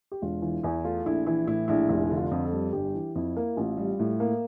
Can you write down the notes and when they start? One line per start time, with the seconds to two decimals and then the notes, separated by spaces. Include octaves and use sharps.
0.12 G4
0.22 E1 F4
0.42 E3 F4
0.63 E2 E4
0.85 A3 F4
1.06 A#1 E4
1.27 E3 E4
1.47 A2 E4
1.68 A#1 E4
1.89 F1 E4
2.11 D3
2.17 F4
2.31 F2
2.45 A4
2.52 G3
2.73 G1 G4
2.95 E3
3.15 F2 E4
3.37 A#3
3.56 A1 F4
3.77 G3
3.99 A2
4.20 A#3